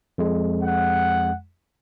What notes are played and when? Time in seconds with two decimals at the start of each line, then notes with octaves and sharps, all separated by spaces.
0.18 F2 G#3
0.63 F#5